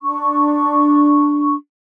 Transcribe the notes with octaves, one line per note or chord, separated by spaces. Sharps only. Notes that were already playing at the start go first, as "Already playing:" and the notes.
D4 C#6